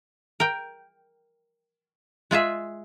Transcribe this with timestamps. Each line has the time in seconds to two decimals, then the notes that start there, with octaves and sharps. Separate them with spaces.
0.40 A#4 G5
2.31 G#3 F4 G#4 E5